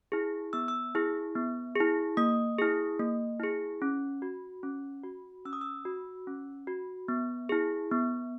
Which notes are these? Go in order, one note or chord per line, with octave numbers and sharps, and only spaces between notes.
E4 G#4
B3 E6
E6
E4 G#4
B3
E4 G#4
A#3 D#6
E4 G#4
A#3
E4 G#4
C#4
F#4
C#4
F#4
C#4 E6
D#6
E6
F#4
C#4
F#4
B3
E4 G#4
B3